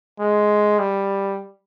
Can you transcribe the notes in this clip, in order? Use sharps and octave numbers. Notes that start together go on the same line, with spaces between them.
G#3
G3